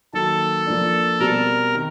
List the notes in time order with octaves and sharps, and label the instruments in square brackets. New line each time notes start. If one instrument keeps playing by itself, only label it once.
[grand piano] D#3 F#3 A#3 [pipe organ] A4
[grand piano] F3 A#3 D4
[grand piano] B2 G3 C4 [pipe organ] A#4
[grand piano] D#3